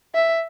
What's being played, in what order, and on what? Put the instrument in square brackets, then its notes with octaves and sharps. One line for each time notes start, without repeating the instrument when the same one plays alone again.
[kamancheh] E5